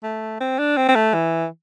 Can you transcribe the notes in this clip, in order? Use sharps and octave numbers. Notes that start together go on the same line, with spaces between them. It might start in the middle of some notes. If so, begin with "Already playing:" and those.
A3
C4
D4
C4
C4
A3
E3